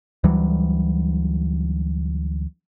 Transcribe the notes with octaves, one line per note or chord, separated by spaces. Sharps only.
D2 E3 F#3 G3